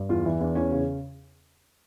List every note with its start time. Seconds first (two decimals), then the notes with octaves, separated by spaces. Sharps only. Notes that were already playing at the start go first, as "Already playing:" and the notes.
Already playing: G2
0.09 E2 F4
0.25 E3 E4
0.41 E2 D4
0.55 E2 C#4
0.72 C#3